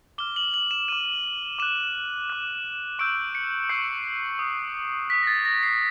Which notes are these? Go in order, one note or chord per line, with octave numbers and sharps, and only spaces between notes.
D6 F6 G7
F#7
F#7
E7
D6 F6 D#7
D6 F#6 E7
D6 F#6
C#6 E6 G6 D7
C#7
C#6 E6 G6 C7
D#6 F#6
D#6 F#6 B6
A#6
A6
A#6
C7